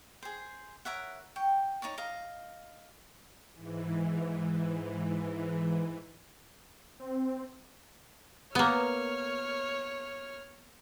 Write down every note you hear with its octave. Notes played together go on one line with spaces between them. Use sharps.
G#4 C5
A#4 C#5 E5 F#5
G5 C#6
D#4 C#5 D5 C#6
D#5 F5 A#5
G#2 E3
C4
A#3 B3 C#5 F6